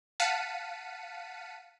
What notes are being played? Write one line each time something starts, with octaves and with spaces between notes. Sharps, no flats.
F5 F#5 A5 B6 C#7 D#7